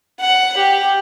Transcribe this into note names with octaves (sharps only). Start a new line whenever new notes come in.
F#5
G4